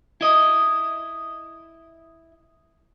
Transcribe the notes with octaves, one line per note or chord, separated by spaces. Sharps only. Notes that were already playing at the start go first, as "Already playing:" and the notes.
E4 D#5